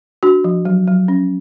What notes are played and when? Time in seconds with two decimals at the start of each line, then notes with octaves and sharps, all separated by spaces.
0.23 D4 F#4
0.44 F3
0.65 F#3
0.87 F#3
1.08 C#4